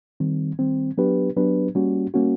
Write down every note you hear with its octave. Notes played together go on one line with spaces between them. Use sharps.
D#3 G3 C4
D#3 G3 C4
F#3 B3 D4 G4 B4
F#3 B3 D4 G4 B4
G3 A#3 C#4 F#4
G3 A#3 C#4 F#4